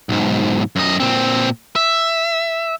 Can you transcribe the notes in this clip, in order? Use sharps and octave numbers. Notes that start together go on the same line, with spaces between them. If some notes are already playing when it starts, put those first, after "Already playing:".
B1 G#2
F#2 D#5
A#2 C4
E5